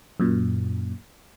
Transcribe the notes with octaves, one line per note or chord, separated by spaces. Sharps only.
F#2 A#2